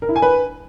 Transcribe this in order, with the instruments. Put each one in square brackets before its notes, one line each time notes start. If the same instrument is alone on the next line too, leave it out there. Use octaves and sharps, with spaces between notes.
[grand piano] A#4
E4
G#5
B4